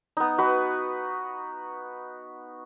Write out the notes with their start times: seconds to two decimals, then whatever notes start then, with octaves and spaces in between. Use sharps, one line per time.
0.17 B3 D#4
0.38 F#4 B4 D#5